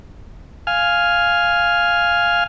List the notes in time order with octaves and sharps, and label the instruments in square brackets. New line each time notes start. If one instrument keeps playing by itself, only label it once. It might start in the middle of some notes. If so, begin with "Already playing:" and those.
[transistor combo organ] F5 G#5 F6